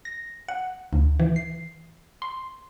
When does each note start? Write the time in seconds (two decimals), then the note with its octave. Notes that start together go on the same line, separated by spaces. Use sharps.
0.05 A#6
0.48 F#5
0.93 D2
1.20 E3
1.36 C7
2.22 C6